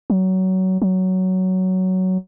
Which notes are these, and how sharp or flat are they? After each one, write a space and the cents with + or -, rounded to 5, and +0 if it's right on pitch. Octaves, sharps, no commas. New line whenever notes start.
F#3 +20
F#3 +10